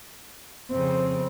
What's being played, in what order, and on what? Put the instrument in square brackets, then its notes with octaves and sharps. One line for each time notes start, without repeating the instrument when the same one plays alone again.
[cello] F2 C#3 [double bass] C4